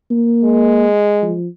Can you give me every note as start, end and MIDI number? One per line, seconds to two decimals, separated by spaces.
0.11 0.87 58
0.44 1.36 56
1.22 1.47 53